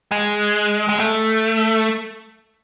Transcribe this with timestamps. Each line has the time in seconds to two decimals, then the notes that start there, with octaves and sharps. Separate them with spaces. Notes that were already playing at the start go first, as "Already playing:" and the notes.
0.11 G#3
0.89 G#3
1.00 A3